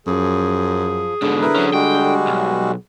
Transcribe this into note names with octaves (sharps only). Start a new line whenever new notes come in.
F#2 F3 G#4
G#2 B2 D3
E4 A#4 B4
F#3 C#4
G3 G#3 F#4 G5
B1